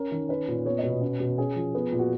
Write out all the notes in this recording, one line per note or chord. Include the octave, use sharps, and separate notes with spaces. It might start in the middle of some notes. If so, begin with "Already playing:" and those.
Already playing: C#4 A#4
D#3
C#4 B4
A#2
B3 C#5
D#5
B2
B4
C#4
B2
C#4 G#4
F3
B3
A#2
F#4